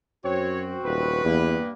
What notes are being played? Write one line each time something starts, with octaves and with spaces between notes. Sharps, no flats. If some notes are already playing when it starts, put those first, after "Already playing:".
F#2 C4 F#4 C#5
D#1 B3 B4
E2 G2 A#3